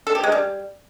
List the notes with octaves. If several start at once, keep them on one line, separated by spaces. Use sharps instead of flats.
A4
G4
G#3
G3